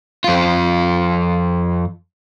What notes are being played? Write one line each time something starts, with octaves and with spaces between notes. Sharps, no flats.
F2 F4